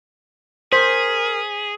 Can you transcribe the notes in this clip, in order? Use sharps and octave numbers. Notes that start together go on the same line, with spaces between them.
G#4 A#4 C5 B6